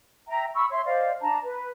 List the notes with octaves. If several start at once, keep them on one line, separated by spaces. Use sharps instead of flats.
E5 G5 A#5
B5 C#6 E6
C#5 E5 C6
C5 D5 D#5 F5
D4 A5 A#5
B4